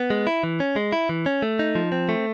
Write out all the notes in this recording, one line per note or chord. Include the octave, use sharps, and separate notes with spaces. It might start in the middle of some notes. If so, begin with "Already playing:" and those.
Already playing: B3
G#3
E4
E3
C#4
G#3
E4
E3
C#4
A3
D#4
F3
C4
A3